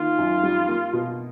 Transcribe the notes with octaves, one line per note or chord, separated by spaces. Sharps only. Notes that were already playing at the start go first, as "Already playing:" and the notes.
Already playing: D#3 A#3 F4
F#2
G3
A#3
B2